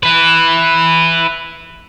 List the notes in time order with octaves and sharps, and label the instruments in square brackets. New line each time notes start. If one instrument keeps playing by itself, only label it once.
[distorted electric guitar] E4 B4